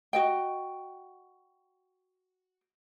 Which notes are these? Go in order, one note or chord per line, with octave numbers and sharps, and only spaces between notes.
F#4 D#5 G5